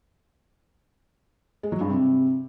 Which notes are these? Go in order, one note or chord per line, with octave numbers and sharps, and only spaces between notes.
G#3
F#3
G2
C3